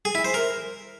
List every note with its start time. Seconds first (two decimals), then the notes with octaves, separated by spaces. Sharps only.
0.05 G#4
0.15 E4
0.24 C5
0.34 A#4